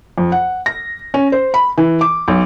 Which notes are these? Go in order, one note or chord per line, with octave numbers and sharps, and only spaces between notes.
F2
F#5
A#6
C#4
C5
B5
E3
D6
B1